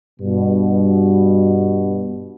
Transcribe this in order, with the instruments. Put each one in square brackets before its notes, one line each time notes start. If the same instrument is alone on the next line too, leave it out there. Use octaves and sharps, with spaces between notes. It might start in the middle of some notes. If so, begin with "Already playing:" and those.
[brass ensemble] G2 B2